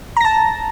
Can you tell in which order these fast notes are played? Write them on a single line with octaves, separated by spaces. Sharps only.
A#5 A#6 A5